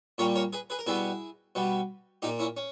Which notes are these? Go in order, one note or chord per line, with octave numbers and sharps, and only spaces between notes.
A#2 G3 A#3 A#4 C#5
A#4 C#5
G#4 B4
G#4 B4
A#4
B2 G3 B3 E4 G#4
B2 G3 B3
A#2 A#3 D#4 G4
C#4 E4
C#4